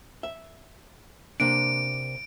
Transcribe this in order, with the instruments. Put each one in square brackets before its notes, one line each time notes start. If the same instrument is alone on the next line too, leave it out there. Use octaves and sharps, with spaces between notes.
[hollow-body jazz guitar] E5
[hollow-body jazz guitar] C3 A#3 D4 [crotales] D7